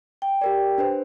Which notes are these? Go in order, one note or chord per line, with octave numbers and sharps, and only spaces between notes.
G5
G4 A#4 D5
D4 B4 C5